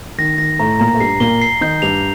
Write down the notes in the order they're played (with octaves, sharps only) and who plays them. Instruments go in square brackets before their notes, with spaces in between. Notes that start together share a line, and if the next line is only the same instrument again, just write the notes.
[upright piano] D#3 [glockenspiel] A#6
[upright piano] D#3 [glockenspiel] A#6
[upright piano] A2 A3 [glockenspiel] A#5
[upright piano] A#2 A#3 [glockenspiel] A#5
[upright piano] A3
[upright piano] G2 G3 [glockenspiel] C7
[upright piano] A#2 A#3 [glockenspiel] G7
[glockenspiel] C7
[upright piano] D#3 D#4 [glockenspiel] G6
[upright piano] G2 G3 [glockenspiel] F7